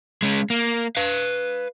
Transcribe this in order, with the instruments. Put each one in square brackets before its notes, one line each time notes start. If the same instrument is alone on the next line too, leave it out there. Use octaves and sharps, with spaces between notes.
[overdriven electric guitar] G#3 C#4
A#3
B4 F5